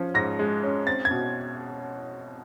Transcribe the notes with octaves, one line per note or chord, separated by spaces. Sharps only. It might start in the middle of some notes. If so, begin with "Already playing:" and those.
Already playing: F3 C#4
G#2 A#6
G#3
C#4
C4 A6
G#6
B2